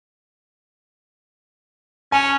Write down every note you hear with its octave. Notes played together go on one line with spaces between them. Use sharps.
C#4 G#5